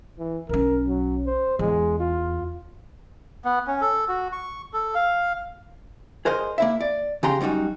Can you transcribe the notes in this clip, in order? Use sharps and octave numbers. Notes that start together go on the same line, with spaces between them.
E3
B1 C#4 A#4
F#3
C5
E2 G#3
F4
B3
C#4
A4
F#4
C#6
A4
F5
G#4 A#4 C5 D#5
A#3 E4 E5
D5
C#3 G4 G5 A#5 C6
F#2 G3 D#4 F4 F#4